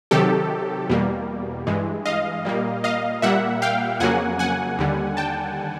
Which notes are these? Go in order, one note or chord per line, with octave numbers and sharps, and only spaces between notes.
C3 D#3 F#3 G4 A4
E2 B2 G3 A#3
G2 E3 G#3
D#5 F5
A#2 G3 A#3
D#5 F5
A#2 G3 A#3 E5 F#5
F5 G5
F2 C#3 F#3 A#3 F#5 G#5
F#5 G#5
D#2 D3 G3
G5 A5